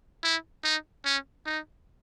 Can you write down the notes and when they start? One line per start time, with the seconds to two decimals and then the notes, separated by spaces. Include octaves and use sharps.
0.24 E4
0.64 D#4
1.05 C#4
1.46 D#4